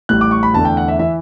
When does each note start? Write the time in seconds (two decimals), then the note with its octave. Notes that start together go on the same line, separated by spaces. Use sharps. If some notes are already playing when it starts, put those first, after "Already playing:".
0.09 A1 A2 G3 F#6
0.21 D6
0.31 C#6
0.43 B5
0.54 E2 D3 A3 A5
0.65 G5
0.77 F#5
0.88 E5
0.99 E3 E5